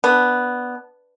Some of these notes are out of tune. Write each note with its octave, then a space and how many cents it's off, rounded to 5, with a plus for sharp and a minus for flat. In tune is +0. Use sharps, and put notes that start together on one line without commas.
B3 +0 D4 +0